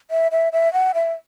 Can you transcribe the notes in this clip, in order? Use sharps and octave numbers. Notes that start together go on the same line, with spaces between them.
E5
E5
E5
F#5
E5